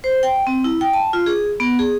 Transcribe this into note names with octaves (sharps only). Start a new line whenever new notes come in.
C5
G5
C4
E4
G5
A5
F4
G#4
B3
G#4